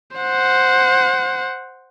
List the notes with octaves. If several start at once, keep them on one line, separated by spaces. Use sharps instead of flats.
C5 F#5